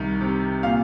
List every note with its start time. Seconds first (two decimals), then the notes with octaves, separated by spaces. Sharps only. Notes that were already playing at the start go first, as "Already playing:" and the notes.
Already playing: C2 D#3
0.21 C3
0.63 A#2 F5